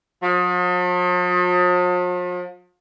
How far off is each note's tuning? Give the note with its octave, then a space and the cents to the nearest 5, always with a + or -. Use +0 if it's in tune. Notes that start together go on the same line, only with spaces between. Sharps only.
F3 +45